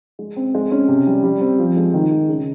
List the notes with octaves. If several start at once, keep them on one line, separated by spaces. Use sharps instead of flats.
G#3
C4
G#3
C#4
C3
G3
G3
C4
F3
G#3
D#3
G#3
C#3